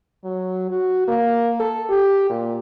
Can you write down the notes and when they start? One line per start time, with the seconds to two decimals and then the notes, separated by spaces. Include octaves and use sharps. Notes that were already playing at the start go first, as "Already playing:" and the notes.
0.24 F#3
0.71 F#4
1.08 A#3
1.60 A4
1.89 G4
2.29 A#2